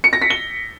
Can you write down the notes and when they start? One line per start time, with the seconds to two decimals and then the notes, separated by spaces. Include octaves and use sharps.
0.04 C#7
0.13 A#6
0.22 B6
0.30 G7